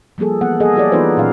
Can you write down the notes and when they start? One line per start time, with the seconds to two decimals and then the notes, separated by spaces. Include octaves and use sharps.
0.18 F3 G3 A#3 G#4 A4
0.41 E3 A#3 B3 F#5
0.60 A#3 G#4 A4 D#5
0.75 F#3 E4 G4 A4 C#5 D5
0.92 E3 B3 D#4 F4 B4 C5
1.17 A#2 D#3 F#3 C#4 F5